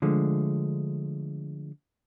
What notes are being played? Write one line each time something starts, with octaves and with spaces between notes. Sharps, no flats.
D3 F3 G#3 A3